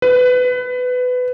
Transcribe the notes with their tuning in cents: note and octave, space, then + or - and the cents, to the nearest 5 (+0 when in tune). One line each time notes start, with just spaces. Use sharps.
B4 +20